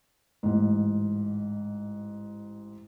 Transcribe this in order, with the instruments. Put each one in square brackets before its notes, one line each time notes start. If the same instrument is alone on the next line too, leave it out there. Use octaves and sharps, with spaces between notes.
[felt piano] A1 G#2